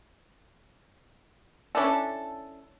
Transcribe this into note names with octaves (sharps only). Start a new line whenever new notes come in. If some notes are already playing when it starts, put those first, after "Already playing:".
C#4 D4 E4 A4